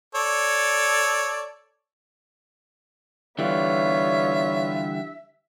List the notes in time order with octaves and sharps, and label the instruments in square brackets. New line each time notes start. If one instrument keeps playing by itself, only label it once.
[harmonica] A4 C#5 D5
[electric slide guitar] D3 E3 G3 [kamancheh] B3 F4 [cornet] C#5 [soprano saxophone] E5